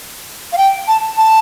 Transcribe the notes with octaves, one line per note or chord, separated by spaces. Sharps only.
F5
G5
A5
A5